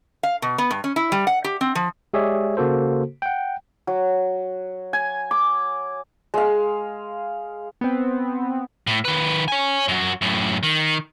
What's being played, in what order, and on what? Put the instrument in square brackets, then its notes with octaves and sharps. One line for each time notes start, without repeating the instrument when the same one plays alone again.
[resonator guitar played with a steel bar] F5
B2
B3
G2
C#4
E4
G3
F#5
G4
C4
F3
[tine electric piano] G#3 G4 G#4 C#5 D5 E5
C#3 A#3 F#4 A4 C5
F#5 G5
[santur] F#3
G#5
D6
G#3 F5
[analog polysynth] B3 C4
[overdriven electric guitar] A2
D#3 B4
C#5 G#5
F#2 F#4
F#2 A2
D#3